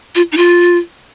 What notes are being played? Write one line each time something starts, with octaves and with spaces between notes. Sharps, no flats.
F4
D#4
F4